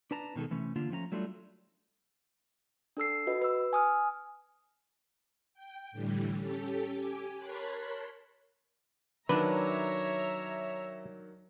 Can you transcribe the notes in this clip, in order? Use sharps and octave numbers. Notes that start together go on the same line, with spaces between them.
D4 B4 A5 A#5
B2 D#3 G#3 A4
C3 E3 A3 C#4
D3 A#3 D4 F4
F3 A3 C#4 F5 A#5
F#3 G3 A3 D4 F4
D4 A4 E6 C7
F#4 B4 D#5
B4 E6
G#5 D#6 F6
G5
A2 D3 E3 G3
C#4 G4 A4
G4 G#5 D6
A#4 C#5 A5 B5 C6 F#6
D#3 F#3 D4 B4 C#5 E5 A#5